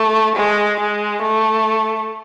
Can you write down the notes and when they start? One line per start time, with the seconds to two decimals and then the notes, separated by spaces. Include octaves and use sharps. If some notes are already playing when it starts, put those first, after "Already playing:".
Already playing: A3
0.36 G#3
0.80 G#3
1.23 A3